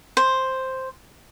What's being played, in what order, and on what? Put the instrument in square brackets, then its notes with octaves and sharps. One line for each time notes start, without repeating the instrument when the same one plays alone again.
[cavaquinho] C5